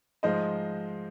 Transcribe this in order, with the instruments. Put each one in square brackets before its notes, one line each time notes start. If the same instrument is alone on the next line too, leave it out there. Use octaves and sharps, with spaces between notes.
[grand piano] G#2 F3 G#3 C5 D#5